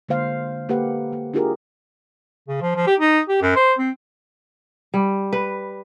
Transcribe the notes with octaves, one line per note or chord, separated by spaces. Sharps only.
D3 G#3 A#3 C5 F5
A#3 G4 A4 B4 F#5
A#3
D4 E4 F4 G4 G#4 A#4
C#3
F3
F3
G4
D#4
G4
F#2
C5
C4
G3
B4